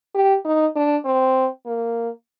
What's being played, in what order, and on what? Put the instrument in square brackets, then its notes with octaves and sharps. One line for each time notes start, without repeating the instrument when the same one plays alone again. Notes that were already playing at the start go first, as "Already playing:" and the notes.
[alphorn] G4
D#4
D4
C4
A#3